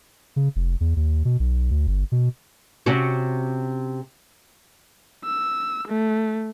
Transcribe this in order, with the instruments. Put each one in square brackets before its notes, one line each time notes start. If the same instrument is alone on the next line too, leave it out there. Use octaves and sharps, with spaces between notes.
[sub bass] C#3
F1
E2
D#2
B2
B1
D2
G1
B2
[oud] C3 C#4 F#4
[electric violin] E6
A3